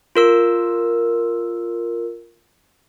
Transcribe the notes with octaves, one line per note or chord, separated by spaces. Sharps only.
F4 A#4 E6